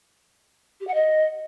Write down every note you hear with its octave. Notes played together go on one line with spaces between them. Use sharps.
G4
F#5
D#5